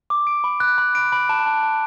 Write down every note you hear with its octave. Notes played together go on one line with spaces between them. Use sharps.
D6
D7
B5
F#6
B5
D7
B5
A5
A5
A5